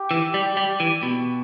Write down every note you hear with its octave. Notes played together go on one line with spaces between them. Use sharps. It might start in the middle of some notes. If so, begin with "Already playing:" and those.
Already playing: G4
E3
G3
G3
E3
B2